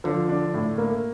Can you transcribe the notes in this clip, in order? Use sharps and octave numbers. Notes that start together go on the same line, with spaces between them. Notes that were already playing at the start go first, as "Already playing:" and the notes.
D3 F3
D4
A2
A#3